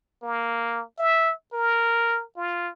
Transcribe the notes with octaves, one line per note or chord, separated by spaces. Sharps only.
A#3
E5
A#4
F4